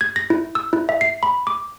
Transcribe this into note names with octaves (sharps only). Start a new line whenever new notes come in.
G#6
A#6
E4
E6
E4
E5
C7
B5
D6